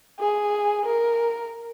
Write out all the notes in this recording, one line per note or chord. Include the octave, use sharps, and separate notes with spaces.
G#4
A#4